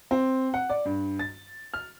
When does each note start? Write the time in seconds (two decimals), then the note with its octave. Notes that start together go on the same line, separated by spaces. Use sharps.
0.11 C4
0.54 F#5
0.70 D5
0.85 G2
1.19 A6
1.74 F6